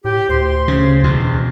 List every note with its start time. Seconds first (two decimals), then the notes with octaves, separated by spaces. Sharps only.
0.05 A2 G4
0.29 D2 C5 C6
0.68 C#3
1.04 E2 B2